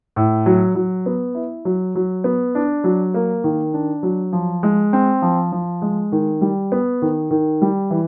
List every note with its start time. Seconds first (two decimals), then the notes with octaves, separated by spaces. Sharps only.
0.16 A2
0.46 F#3
0.75 F#3
1.06 B3
1.35 E4
1.65 F#3
1.95 F#3
2.24 B3
2.55 D4
2.84 F#3
3.14 A#3
3.44 D#3
3.74 D4
4.03 F#3
4.33 F3
4.63 G#3
4.93 C4
5.22 F3
5.52 F3
5.82 G#3
6.12 D#3
6.41 G3
6.72 B3
7.02 D#3
7.31 D#3
7.62 G3
7.91 E3